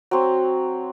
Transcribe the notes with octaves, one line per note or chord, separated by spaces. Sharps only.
F#3 C4